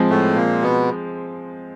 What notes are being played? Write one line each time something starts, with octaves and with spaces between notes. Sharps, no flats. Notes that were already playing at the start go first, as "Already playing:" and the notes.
Already playing: F3 G#3 C4
A2 A3
A#2 A#3
B2 B3